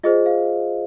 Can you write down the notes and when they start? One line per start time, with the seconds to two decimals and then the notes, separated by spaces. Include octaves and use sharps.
0.04 F4 G#4 C5 D#5
0.26 F5